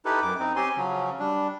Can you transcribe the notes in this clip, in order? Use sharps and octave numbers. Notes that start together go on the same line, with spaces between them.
D#4 E4 G4 A4 B4
F#2 D6
C4 D#4
C4 C#4 G4 G#5 C6
C#3 F3 F#3 C#4
G3 D4